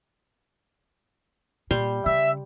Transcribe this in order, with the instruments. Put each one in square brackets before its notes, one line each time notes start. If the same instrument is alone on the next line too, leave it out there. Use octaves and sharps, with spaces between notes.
[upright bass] A#2 [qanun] G3 C6
[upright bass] C#3 [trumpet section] E5